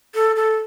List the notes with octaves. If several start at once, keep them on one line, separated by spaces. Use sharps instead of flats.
A4
A4